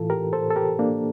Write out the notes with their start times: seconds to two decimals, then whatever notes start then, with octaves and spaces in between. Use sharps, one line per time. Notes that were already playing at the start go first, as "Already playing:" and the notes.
Already playing: A2 E3 F4 A4
0.10 G4 A#4
0.33 A4 C5
0.50 A4
0.56 G4 A#4
0.79 A#3 D4